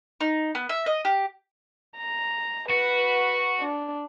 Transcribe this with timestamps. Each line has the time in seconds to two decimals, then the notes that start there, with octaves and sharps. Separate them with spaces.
0.21 D#4
0.55 B3
0.69 E5
0.86 D#5
1.05 G4
1.97 A#5
2.69 F#4 B4
3.61 D4